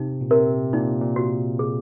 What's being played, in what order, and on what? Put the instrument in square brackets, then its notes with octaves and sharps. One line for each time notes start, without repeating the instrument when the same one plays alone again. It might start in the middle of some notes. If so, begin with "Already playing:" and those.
Already playing: [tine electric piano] C3 [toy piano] D#4
[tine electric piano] A#2
[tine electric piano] C3 [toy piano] A#4
[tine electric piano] A#2 [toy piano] D#4
[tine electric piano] A#2
[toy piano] F#4
G#4